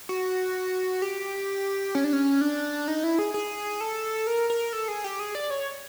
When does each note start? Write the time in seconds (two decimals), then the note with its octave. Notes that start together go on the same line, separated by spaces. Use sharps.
0.09 F#4
1.02 G4
1.95 C#4
2.04 D4
2.13 C#4
2.41 D4
2.88 D#4
3.04 E4
3.19 G#4
3.34 G#4
3.81 A4
4.27 A#4
4.50 A#4
4.73 A4
4.88 G#4
5.04 G4
5.20 G#4
5.35 D5
5.51 C#5